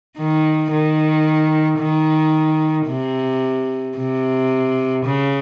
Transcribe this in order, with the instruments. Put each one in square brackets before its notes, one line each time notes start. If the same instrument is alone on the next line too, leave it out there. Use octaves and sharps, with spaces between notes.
[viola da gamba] D#3
D#3
D#3
C3
C3
C#3